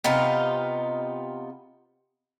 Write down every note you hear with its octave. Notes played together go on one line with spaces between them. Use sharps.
C3 B3 D#4 F4